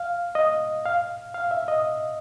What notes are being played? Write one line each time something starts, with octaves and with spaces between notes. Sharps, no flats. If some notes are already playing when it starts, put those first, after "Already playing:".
Already playing: F5
D#5
F5
F5
E5
D#5